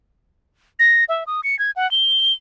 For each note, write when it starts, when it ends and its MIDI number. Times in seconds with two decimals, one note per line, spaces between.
0.79 1.04 94
1.09 1.24 76
1.27 1.41 87
1.44 1.58 97
1.59 1.71 92
1.76 1.90 78
1.91 2.33 103